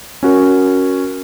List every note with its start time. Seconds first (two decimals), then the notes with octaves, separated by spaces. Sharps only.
0.23 C#4 F#4 A#4